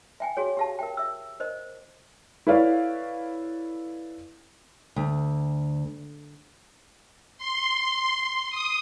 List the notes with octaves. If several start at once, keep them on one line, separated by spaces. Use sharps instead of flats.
E5 G5 G#5
F#4 G#4 C#5
G4 F5 A5
A#4 E5 G5
E5 E6
A#4 C5 D#5
E4 A4 B4 C#5 D5 F5
D2
C6
D#6